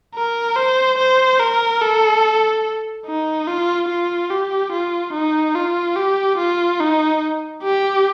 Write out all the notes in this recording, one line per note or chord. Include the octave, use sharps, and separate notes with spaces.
A#4
C5
C5
A#4
A4
D#4
F4
F4
G4
F4
D#4
F4
G4
F4
D#4
G4